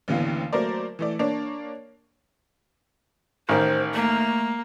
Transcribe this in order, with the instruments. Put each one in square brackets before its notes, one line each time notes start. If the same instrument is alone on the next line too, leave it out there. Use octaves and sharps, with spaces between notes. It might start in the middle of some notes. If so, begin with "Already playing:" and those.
[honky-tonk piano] A1 D#2 D3 E3 B3 F5
F#3 A3 A#3 A#4 C5 D5
E3 A3 D5
A#3 D4 C#5 D5
[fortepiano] A1 D#3 [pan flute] C5
[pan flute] A3 [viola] A#3